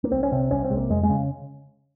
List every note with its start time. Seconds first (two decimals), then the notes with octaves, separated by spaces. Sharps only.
0.04 A#3
0.12 C2 C4
0.23 C#4
0.32 C3 C4
0.51 C2 C#4
0.64 C4
0.70 C3 G#3
0.77 A#3
0.90 F2 G#3
1.03 G#3
1.09 C#3